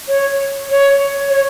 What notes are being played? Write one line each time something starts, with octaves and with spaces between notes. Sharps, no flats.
C#5
C#5
C#5